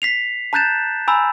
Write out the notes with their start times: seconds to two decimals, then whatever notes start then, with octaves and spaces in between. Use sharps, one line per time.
0.02 B6 C7 F7
0.53 A5 A#5 F#6 G6 A6 E7
1.08 G#5 A#5 B5 E6